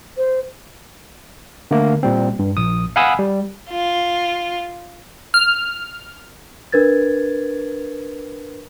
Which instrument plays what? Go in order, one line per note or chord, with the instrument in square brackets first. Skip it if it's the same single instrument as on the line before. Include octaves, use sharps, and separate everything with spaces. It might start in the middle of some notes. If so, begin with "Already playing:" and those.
[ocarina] C5
[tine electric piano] D3 A3 A#3
A#2 G3 C4
G2
A#1 D#6
F5 F#5 G#5 B5 D#6 E6
G3
[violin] F4
[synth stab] F6
[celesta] D4 A#4 B4 G#6 A6